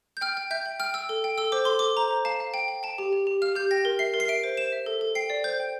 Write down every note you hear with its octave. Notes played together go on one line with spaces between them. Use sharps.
G6
G5 F6
G5
E5 G6
G5
G5 F6
G5 E6
A4
G5
A4 E6
C5 D6
A4 C6
D6
A4
C5 A#5
C5
F5 A5
F5
G5
G5
G5 A5
G4
G4
G4
F5 F6
G4 G6
G5 A#6
A#4
E5 C7
A#4
C7
E5 D7
C5
C5 E7
E5
A4
A4
G5 C7
D5
C5 G6
G5